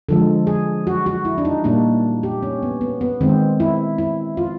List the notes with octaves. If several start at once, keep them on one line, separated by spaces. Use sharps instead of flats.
D3 F3 G#3 A4
G#4
F#4
F#4
E4
D4
D#4
A#2 G3 A#3 D4
G4
C#4
B3
B3
B3
D#3 G#3 C4
E4
E4
F4